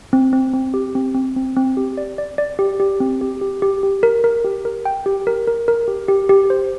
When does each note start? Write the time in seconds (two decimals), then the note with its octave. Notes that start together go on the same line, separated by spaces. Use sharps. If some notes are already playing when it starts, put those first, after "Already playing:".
0.13 C4
0.33 C4
0.53 C4
0.74 G4
0.95 C4
1.15 C4
1.36 C4
1.56 C4
1.77 G4
1.98 D5
2.18 D5
2.38 D5
2.59 G4
2.80 G4
3.00 C4
3.21 G4
3.41 G4
3.62 G4
3.83 G4
4.03 A#4
4.24 A#4
4.44 G4
4.65 A#4
4.85 G5
5.06 G4
5.27 A#4
5.47 A#4
5.68 A#4
5.88 G4
6.08 G4
6.29 G4
6.50 C5